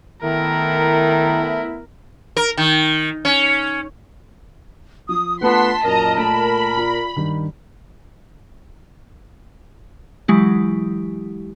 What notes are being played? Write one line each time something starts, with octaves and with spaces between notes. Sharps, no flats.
D#3 A3 B3 E4 A#4
A#4
D#3
C#4
F3 D#6
A3 B3 D4 F4 F#5 A5 C6 B6
F#2 A#2 A#4 D#5 A#5
A3 B5 D7
F4 D5
G2 D#3
E3 F#3 G#3 E4 G4